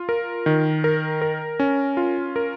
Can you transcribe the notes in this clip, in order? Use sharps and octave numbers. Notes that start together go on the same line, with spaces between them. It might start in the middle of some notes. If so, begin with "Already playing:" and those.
Already playing: F4
A#4
D#3
A#4
A#4
C#4
F4
A#4